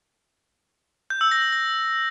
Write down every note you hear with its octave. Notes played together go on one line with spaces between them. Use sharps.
G6
E6
A#6
A#6
A#6